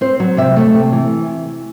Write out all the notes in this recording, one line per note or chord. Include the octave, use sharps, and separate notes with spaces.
C4 C5
F#3
C3 E5
A3
C3
E3